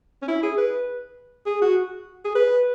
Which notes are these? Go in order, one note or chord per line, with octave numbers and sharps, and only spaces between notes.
C#4
E4
G#4
B4
G#4
F#4
G#4
B4